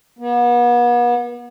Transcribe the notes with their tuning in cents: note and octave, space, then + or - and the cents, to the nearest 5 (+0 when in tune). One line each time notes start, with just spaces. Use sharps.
B3 -40